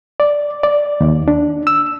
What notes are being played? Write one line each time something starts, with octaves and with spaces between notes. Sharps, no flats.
D5
D5
D#2
D4
E6